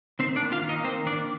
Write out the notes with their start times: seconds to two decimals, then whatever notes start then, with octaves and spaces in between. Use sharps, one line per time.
0.19 D#3 C4 C5
0.36 D4 D5
0.42 A#3
0.52 F4 F5
0.63 D#3
0.69 D#4 D#5
0.84 A#3 C4 C5
1.06 D#3 D4 D5